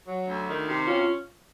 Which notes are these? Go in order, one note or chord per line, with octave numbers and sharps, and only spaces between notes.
F#3
D2
D#3
C3
C#4 F4
F4